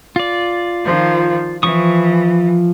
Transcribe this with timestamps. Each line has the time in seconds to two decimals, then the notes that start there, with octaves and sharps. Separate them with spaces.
0.16 F4 D5
0.85 D#3 F3
1.63 E3 F3 C#6 D#6